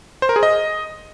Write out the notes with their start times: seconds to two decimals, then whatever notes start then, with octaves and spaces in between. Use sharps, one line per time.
0.22 C5
0.29 A#4
0.36 G#4
0.43 D#5